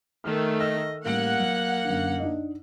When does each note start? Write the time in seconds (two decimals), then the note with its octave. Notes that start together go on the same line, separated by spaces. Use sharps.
0.24 D#3 A3 F6
0.60 D#5 E6
1.06 A1 G3 A#3 F#5 D7
1.39 F#3
1.85 F#2 D3
2.19 D4 D#4 D#5